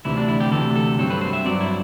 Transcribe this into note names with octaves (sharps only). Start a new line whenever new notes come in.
D2 C3 E3 E4
D4
E4
G4
D2 C3 E3 A4
A4
G2 F#3 C4 A4
B4
C5
E5
G2 F#3 C4 D5
E4